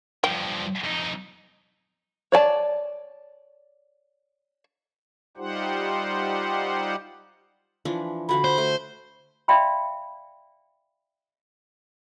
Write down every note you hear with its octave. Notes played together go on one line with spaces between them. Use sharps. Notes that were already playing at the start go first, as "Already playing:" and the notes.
G2 F3 G5
F2 D#4
C#5 D5 G#5 A5
G3 D#4 F4 G4 C5 F#5
E3 F3 D4
D3 F#4 F5 B5
C5
A3
D5 E5 F5 G5 B5 C6